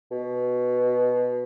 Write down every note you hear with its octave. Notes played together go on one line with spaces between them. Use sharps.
B2